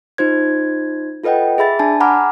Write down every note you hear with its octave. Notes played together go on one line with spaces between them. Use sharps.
D#4 F4 C5 G#6
F4 A4 B4 D#5 F#5 G5
G#4 E5 B5 A6
D4 G#5 A5
F#5 G#5 A#5 B5 D6 F6